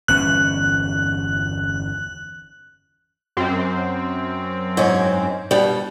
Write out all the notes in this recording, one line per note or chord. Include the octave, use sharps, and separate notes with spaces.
G1 E2 C#4 F#6
F#2 C4
G#2 C#4
B2 G3